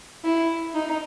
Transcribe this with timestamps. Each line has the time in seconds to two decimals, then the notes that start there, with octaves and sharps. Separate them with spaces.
0.24 E4
0.74 D#4